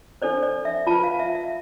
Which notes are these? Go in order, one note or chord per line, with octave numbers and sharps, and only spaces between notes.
D4 A4 C5 D5
D5
E5
F4 B4 A5
F5
E5
E5